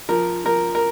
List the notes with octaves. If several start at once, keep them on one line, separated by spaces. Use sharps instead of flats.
F3 A#4
F3 A#4
A#4